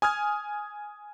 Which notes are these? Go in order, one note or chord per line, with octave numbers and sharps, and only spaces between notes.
G#5 D#6 F6 G#6